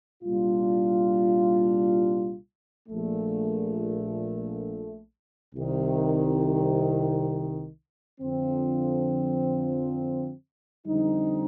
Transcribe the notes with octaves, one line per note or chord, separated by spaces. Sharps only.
C2 A#2 G3 D4 F4
A#1 A#2 A3
C2 C3 D#3
F2 D3 F3 C4
F2 D3 G3 C4 D#4